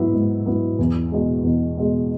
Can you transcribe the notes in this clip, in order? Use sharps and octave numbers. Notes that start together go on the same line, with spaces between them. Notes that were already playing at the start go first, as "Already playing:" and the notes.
Already playing: G#2 F#3 B3 E4
G#2
F#3 B3 E4
E2
B2 G#3
E2
B2 G#3